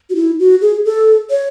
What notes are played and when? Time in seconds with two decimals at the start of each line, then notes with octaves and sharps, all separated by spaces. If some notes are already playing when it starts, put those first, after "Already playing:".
0.10 F#4
0.16 E4
0.39 F#4
0.61 G#4
0.85 A4
1.30 C#5